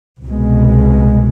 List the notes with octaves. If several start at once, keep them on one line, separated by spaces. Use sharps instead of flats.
C2 B2 G#3